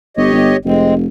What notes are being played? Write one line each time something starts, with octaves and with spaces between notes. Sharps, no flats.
G1 G4 C#5 D#5
G1
F1 G#3 C4